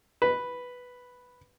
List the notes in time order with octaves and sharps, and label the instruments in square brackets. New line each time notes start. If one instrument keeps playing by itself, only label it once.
[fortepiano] B4